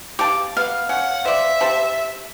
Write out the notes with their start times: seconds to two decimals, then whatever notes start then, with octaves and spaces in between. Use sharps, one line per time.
0.19 G4 F5 A5 D6
0.57 B3 F5
0.89 C#4 F#5
1.25 C5 D5 E5
1.61 G4 C5 A5